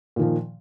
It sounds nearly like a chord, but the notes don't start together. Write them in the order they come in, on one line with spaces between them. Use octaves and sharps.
A#2 D#3 F3